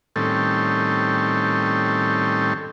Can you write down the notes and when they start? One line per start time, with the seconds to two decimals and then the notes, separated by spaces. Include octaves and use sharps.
0.16 A2 D#3 G3 C4 C#4 A4